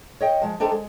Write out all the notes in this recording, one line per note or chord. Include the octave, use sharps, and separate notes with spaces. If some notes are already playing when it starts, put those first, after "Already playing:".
C#5 D#5 G5
F3 G#3
D4 D#4 G4 A4 C5
G#3